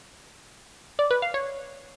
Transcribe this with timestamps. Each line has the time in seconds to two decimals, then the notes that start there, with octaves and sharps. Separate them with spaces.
0.99 D5
1.11 B4
1.22 F5
1.34 C#5